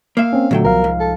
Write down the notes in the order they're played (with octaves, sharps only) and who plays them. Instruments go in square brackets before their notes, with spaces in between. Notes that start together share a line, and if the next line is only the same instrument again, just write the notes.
[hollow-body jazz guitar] A#3 E5 [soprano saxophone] F5
[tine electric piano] C4 C#4
[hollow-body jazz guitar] E2 F#3 G5 [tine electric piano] A#2 D3 A3
[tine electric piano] C2 F3 F5 [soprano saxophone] A#4
[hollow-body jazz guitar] G#2
[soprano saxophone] A4